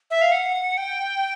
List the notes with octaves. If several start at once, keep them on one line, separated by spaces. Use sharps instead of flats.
E5
F5
F#5
G5